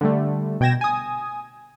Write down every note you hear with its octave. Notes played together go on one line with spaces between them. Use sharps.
D3 G3 A3
B2 G5 G#6 A#6 E7
G#5 D#6